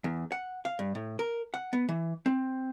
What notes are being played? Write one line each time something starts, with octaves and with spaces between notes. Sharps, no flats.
E2
F#5
F5
G2
A2
A#4
F#5
B3
E3
C4